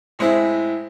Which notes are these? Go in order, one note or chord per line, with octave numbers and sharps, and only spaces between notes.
A2 G#3 C4 E4